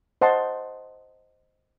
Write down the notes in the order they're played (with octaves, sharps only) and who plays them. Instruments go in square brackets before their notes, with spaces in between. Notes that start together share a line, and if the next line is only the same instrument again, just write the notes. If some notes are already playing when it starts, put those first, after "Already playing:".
[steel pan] C5 D#5 F#5 A5 C6